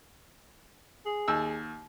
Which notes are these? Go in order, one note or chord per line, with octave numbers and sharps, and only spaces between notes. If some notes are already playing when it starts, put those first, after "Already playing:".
G#4
D#2 E6